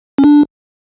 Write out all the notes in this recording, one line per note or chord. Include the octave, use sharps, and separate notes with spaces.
C#4
D4